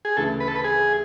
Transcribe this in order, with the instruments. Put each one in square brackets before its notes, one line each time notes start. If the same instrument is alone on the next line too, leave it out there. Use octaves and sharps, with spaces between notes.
[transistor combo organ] G#4
[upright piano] D2 C#3 E3 [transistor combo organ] A4
[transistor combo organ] B4
A4
B4
G#4